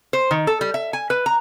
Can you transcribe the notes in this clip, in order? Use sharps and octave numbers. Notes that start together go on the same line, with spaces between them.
C5
D#3
A4
G3
E5
G#5
B4
A#5